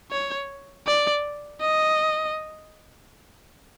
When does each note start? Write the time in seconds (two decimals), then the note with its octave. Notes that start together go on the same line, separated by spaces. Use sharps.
0.11 C#5
0.87 D5
1.61 D#5